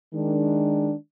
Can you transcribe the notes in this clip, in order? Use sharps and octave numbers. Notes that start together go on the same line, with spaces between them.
D#3 G#3 D4